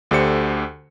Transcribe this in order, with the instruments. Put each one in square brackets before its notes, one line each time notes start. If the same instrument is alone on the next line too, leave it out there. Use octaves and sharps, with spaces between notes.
[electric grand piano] D2 D3 G4 C5 C#7